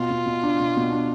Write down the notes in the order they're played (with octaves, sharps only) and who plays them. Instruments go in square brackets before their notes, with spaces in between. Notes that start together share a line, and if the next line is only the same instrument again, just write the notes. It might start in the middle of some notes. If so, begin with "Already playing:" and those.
Already playing: [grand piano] B2 [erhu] F4
[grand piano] B2
B2
D4
B2
B2
D4